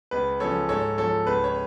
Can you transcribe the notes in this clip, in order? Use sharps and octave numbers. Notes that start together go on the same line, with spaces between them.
C#2 B4
C#3 F3 A4 C#5
G#2 A4 C#5
F3 A4 C#5
C#2 B4
C#5